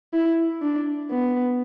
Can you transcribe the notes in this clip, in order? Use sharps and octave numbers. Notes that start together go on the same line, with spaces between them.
E4
D4
B3